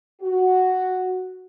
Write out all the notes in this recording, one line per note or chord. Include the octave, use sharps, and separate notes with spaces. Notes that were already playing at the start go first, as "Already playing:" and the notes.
F#4